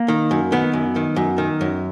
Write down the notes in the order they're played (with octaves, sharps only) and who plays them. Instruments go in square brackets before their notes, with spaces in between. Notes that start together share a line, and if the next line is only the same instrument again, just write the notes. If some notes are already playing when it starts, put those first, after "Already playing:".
Already playing: [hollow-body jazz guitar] A#3
D#3
F#2
D#3 B3
F#2
D#3
F#2
D#3
F#2